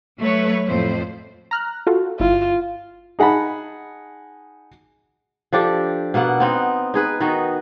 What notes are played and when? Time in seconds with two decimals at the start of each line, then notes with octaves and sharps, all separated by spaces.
0.18 F#3 A3 B4 C#5
0.66 F2 A2 C5
1.51 A#5 F6 F#6
1.87 F4 F#4 A4
2.20 G1 E4 F4
3.19 D#4 G#4 F#5 A5 B5
5.53 F3 D4 G4 A4
6.14 B2 A#3 B3 F#5
6.40 B3 C4 D#4
6.94 D#4 G#4 B4
7.20 D#3 B3 D#4 F#4